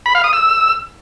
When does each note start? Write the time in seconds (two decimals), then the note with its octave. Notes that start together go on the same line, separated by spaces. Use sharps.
0.06 B5
0.15 F5
0.24 D#6
0.33 E6